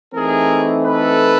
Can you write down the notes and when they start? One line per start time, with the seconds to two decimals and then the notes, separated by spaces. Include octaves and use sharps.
0.13 E3 A3 C4 D#4 G#4 A#4
0.84 A4 B4